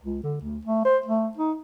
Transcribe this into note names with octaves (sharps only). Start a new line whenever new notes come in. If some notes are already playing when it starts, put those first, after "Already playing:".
C#2
D3
D2
A3
C5
A3
D#4